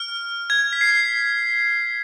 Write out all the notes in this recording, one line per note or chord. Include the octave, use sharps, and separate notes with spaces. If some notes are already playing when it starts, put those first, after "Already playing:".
Already playing: F6
G#6
B6
C7